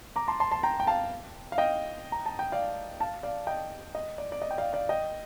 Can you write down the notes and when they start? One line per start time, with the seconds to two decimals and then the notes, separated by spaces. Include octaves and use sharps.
0.16 A#5 D6
0.28 A5 C6
0.40 A5 C6
0.51 A5 C6
0.63 G5 A#5
0.80 G5
0.87 F5 A5
1.52 F5
1.58 D#5 G5
2.12 A#5
2.26 A5
2.39 G5
2.52 D5 F5
3.00 F5 A5
3.23 D5 F5
3.47 D#5 G5
3.95 D#5
4.18 D5
4.32 D5
4.42 D#5
4.51 G5
4.58 D5 F5
4.73 D5 F5
4.89 D#5 G5